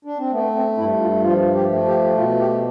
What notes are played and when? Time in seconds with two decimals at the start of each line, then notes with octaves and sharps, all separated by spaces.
0.05 D4
0.18 C4
0.31 A3 B3
0.55 C4
0.77 G2 E4
1.00 F4
1.24 F3 F4
1.54 G4
1.71 A3
1.86 G4
2.16 B2 F4
2.40 G4